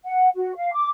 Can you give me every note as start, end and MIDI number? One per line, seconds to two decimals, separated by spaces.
0.04 0.28 78
0.35 0.54 66
0.55 0.73 77
0.74 0.88 86